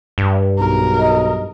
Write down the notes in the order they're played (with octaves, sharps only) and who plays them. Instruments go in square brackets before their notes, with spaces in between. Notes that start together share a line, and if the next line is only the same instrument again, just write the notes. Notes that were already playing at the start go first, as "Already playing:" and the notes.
[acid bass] G2
[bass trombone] B1 [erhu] A#4
[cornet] D#5